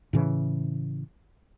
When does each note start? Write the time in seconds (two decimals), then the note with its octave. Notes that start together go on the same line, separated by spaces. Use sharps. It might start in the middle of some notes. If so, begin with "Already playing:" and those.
0.13 A2 C#3 E3